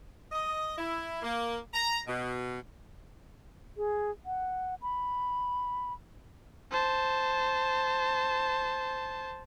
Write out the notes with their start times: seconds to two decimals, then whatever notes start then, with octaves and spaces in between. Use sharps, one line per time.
0.31 D#5
0.77 E4
1.22 A#3
1.73 A#5
2.07 B2
3.77 G#4
4.26 F#5
4.82 B5
6.71 C5 A5